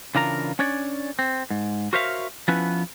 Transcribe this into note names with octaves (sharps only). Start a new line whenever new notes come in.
C#3 E3 D4 F4 A#4 A#5
C#4 D4 C#5 D5
C4
G#2
F#4 A#4 C5 C#5 E5 F5
F3 B3 C#4 E4 B4